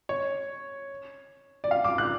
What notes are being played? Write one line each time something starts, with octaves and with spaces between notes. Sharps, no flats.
C#5
D5
F5
D6
F#6